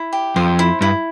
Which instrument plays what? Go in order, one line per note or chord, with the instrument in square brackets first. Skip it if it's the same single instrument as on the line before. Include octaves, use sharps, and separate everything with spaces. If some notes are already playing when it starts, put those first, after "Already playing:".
Already playing: [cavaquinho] E4
G4
[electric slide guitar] F2 [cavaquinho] C5
[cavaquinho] E4
[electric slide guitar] G2 [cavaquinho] E4